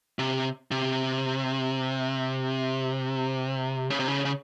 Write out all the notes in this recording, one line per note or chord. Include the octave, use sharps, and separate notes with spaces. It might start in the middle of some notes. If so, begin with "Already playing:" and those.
C3
C3
C#3
C3
C#3
C#3